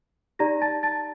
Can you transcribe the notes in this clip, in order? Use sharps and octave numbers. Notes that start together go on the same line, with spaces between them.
D#4 G4 D5 A#5 A#6
A5 A6
A5 A6